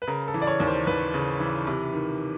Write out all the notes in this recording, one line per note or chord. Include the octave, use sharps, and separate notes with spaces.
B4
C#3 A#4
A4
E3
D5
C#5
D#2
C5
D#2 B4
C#3
E3
C3
D#3